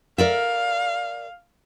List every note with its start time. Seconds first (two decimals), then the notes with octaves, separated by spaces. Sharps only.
0.18 A#4 D5 E5 F5